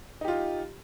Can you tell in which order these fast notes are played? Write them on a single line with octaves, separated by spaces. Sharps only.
D#4 G4 F4